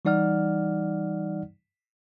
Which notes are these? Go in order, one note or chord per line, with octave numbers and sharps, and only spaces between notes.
E3 G3 D#4 D5 F#5 F6